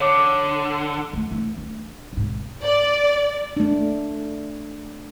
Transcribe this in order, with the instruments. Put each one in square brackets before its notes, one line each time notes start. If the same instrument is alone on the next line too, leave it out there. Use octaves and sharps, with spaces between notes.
[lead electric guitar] D3 [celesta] C#5 D6
[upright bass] E3 A3
E3
D4
C2 G#2
[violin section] D5
[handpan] A3 D4